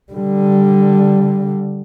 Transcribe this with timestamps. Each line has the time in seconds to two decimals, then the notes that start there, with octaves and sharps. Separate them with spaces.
0.12 D3 G3